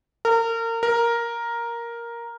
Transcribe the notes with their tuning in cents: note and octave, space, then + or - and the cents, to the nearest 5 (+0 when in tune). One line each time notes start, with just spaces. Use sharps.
A#4 -30
A#4 +5